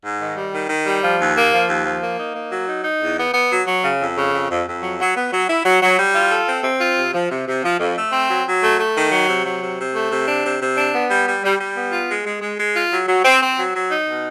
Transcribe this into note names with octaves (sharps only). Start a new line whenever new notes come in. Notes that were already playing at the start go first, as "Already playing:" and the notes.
G#2
D#3
G3
D#3
D#3
G3
F3
D#2
A#3
F3
D#2
F3
A#3
D#4
A#3
F#3
D#4
D#4
E2
B3
B3
F#3
F#3
C#3
F2
C#3
F2
F2
F2
F#3
F#3
B3
F#3
E4
F#3
F#3
G3
F4
A4
C4
C4
F4
C3
F3
C3
C3
F3
F2
A3
C4
F#3
F#3
A3
A3
D#3
F#3
C3
F#3
C3
C3
A3
C3
D4
C3
C3
D4
B3
G3
G3
G3
G3
B3
F4
G#3
G#3
G#3
G#3
F4
F#3
F#3
C4
C4
F#3
F#3
D#4
B2